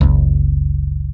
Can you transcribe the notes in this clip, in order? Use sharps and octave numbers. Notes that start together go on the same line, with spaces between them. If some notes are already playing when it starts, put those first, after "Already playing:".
F#1 C#2